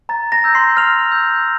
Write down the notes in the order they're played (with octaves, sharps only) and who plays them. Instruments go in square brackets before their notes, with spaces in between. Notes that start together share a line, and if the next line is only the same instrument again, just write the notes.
[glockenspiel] A#5 A6
A#5 A#6
E6 G6
C6 C7
C6 F6 F7
E6 G6